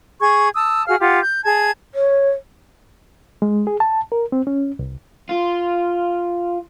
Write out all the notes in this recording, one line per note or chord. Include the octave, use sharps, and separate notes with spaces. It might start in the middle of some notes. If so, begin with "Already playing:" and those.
G#4 C#6 G#6
A5 D#6 E6
F#4 G#4 F5 F6
F4 G4 F#5
G6
G#4 A5 G#6
C#5
G#3
G#4
A5
A#4
C4
C#4
C2
F4